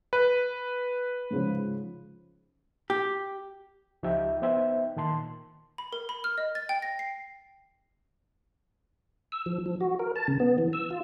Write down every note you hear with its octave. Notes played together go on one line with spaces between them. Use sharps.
B4
G#2 C#3 F3
G4
C#2 F3 D#4 G4 E5 G5
B3 D#4 C5 E5 G5
A#2 D#3 A5 C6
B5
A#4
B5
F6
D#5
A6
G5
A#6
C7
E6
F3
F3
F#4
A#4
A5
C#3
B3
E3
E6
F4